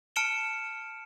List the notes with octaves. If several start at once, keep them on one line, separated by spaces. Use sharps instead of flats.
A5 F6 C#7 D7 E7 G7